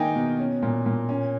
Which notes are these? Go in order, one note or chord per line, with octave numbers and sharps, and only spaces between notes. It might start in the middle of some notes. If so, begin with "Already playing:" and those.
Already playing: D#3 A#3 D#4 G5 G#5
B2
C#4
A#2
A#2
C#4